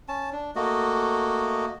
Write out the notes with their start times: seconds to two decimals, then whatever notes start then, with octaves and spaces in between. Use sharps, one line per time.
0.08 C#4 A5
0.33 D4
0.56 A3 A#3 F#4 D#5